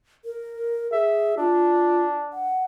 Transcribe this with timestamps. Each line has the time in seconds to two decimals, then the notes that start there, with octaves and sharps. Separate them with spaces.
0.25 A#4
0.92 G#4 E5
1.38 D4 F4
2.33 F#5